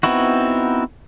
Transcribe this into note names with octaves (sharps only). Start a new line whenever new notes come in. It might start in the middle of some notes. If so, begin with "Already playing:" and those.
B3 C4 D#4 E4 F#4